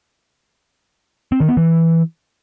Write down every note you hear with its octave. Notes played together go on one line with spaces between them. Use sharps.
C4
D#3
B3
E3